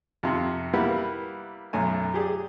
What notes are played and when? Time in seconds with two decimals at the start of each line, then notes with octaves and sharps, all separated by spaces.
0.23 F2 C3
0.73 G3 A#3 B3 E4 B4 F#5
1.73 B1 F#2 A3 G#5
2.14 G4 G#4 D5